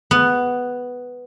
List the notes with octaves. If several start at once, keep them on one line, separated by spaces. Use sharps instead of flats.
B3